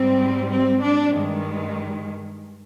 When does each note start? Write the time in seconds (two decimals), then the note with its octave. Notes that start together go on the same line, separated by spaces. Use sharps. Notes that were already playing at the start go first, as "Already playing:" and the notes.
Already playing: G#2 G3 C4
0.49 C4
0.81 D4
1.12 G2 D#3 G#3